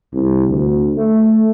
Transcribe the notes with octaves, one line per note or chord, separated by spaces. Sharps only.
C2
D2
A3